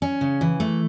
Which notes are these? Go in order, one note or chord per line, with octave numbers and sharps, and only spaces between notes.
C#4
C#3
E3
A3